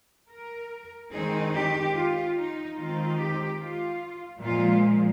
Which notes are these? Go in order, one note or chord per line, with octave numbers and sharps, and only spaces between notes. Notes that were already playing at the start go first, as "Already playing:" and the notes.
A#4
D#3 G#3 C4 D#4 G#4
G4
F4
D#4
D#3 G#3 C4 D#4 F4
G4
F4
A#2 F3 G#3 F4